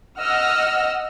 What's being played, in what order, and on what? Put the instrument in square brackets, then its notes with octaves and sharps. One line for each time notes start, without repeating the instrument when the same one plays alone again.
[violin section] D#5 F#5 E6 F6